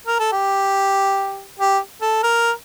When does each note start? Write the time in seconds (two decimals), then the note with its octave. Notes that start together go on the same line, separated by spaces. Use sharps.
0.07 A#4
0.20 A4
0.33 G4
1.60 G4
2.02 A4
2.23 A#4